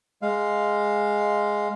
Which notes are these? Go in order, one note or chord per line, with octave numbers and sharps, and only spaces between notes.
G#3 F5